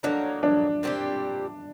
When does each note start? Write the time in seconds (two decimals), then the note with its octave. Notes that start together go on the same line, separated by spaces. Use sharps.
0.03 A2 F#3 A#3 D4 D#4
0.43 D4
0.83 A#2 G3 C4 G4